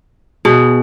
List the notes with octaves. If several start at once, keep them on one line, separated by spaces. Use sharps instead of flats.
B2 G#4